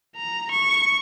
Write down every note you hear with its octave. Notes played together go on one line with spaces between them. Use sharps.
A#5
C#6